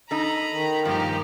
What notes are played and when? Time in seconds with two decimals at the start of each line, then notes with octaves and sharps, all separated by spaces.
0.11 D#4 A4 A#5 B5
0.50 D#3
0.85 G2 A#2 F3 D#4 G4